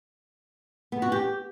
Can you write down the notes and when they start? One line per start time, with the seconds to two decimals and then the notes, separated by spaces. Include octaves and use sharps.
0.92 B3
1.02 F#4
1.12 G4